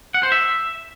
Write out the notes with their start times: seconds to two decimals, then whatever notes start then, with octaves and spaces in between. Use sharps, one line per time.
0.14 F#5
0.23 C5
0.32 E5